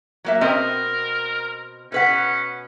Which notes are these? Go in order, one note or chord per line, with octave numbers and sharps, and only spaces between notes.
F#3 A#3 E5
B2 C4 A#4 D#5
B2 C#4 B4 F#5